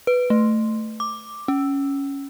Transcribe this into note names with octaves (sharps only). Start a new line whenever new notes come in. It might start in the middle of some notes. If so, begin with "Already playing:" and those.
B4
A3
D6
C#4